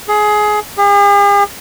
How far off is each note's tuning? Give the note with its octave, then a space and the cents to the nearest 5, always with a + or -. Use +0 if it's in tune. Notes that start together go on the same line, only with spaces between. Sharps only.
G#4 +20
G#4 -45